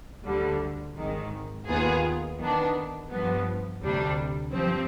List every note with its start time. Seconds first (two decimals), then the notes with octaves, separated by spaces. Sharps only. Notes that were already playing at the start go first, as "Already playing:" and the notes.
0.25 D2 D3 G3
0.97 G#1 G#2 D#3
1.67 D#2 D#3 B3 F4 G#4
2.39 D#3 B3 D4
3.09 G2 F3 B3
3.80 D2 C3 G3 D4
4.52 G2 F3 C4